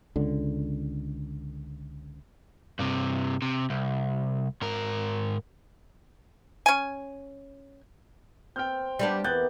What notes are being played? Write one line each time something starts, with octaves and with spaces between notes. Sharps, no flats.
C#2 D3
G2 C3
C3
C2
G#2 A#4
C#4 G#5
C4 G5 F6 G6
G3 B3 D4
E2 B3 G4 A#4 F#6 G6 A6